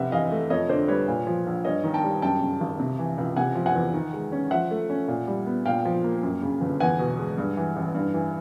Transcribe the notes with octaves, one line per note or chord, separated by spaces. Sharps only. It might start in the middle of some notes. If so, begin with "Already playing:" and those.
Already playing: F1 C3 E5 F#5
E3 D#5 F5
A3
F2 C#5 D#5
D3 C5 D5
G3 B4 C#5
A#2
F3
A#1
G2 C#5 D#5
D#3
G5 A5
G3
F#2 G5 A5
C#3
G#1
C3
E3
C#2
C3 F#5 G#5
F3
F#5 G#5
E2
D#3
G#3
C#4
F3 E5 F#5
A3
C#4
A#2
G3
B3
A#2 F5 G5
F3
A#3
F#2
C#3
G1
E2 F#5 G#5
B2
G#3
G2
E3
A1
G2
E3